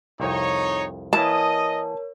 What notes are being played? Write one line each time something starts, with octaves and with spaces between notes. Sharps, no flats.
C2 F2 D#4 C#5
E3 A#3 E4 A#4 C#5 D#5 A5 D#6